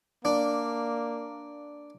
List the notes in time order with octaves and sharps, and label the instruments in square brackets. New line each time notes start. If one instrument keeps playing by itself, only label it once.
[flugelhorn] A#3 [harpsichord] D4